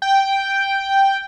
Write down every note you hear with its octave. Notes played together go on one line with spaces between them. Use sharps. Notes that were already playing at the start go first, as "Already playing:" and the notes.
G5